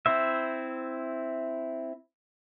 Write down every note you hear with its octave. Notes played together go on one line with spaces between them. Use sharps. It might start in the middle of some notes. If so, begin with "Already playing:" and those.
C4 E4 C5 E5